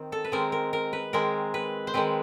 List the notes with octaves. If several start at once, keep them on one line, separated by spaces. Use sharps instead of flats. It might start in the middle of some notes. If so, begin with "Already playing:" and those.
Already playing: D#3 C4
A4
B4
D#3 G#3 C4 A#4
A#4
A#4
B4
D#3 G#3 C4 A#4
B4
C5
D#3 G#3 C4 B4